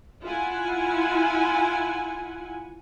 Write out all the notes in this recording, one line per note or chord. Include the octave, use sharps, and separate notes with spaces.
E4 F4 F#5 G#5